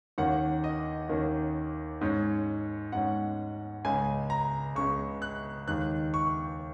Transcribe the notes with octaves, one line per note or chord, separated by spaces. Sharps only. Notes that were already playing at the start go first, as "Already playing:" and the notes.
D#2 D#3 A#3 C#4 F#5
D#5
D#2 D#3 A#3 C#4
G#2 G#3 C#4
G#2 G#3 C#4 F#5
C#2 C#3 G#3 G#5
A#5
C#2 C#3 G#3 C#6
F#6
D#2 D#3 G#3 F#6
C#6